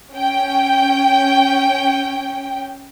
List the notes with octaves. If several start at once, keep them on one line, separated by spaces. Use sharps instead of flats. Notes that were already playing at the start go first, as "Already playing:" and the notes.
C#4 G5